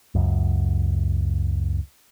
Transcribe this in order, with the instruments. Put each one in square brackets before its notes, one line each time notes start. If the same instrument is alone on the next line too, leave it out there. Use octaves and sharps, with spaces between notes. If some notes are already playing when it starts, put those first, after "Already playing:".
[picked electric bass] C#2 F#2